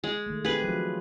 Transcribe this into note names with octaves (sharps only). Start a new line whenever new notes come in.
G#3
D#3 A3
C4 G4 G#4 B4
F3 F#3 F4